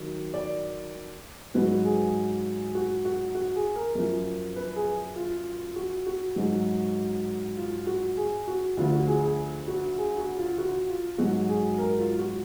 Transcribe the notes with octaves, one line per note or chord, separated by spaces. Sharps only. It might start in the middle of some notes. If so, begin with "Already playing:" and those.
Already playing: D#3 F#3
D5
G#2 F#3 B4
G#4
F#4
F#4
F#4
G#4
A#4
F#2 F3
B4
G#4
F4
F#4
F#4
G#2 F#3
F4
F#4
G#4
F#4
D2 D3 F3 F4
F#4
G#4
G#4
F#4
G#4
F#4
F4
F#4
F4
G#2 F#3 F#4
G#4
A#4
F4
F#4